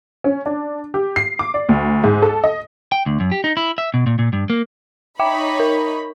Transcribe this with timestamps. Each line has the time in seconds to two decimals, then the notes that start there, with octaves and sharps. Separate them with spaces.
0.24 C#4
0.46 D4
0.94 G4
1.16 C7
1.39 D6
1.54 D5
1.69 D2
2.04 G#2
2.22 A4
2.44 D#5
2.92 G5
3.06 D2
3.20 F#2
3.32 G4
3.44 D#4
3.57 E4
3.78 E5
3.94 B2
4.07 A#2
4.19 A#2
4.33 G2
4.50 A#3
5.19 D#4 C#5 E5 G5 B5 D6
5.60 A#4